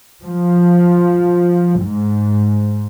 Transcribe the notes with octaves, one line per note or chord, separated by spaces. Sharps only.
F3
G#2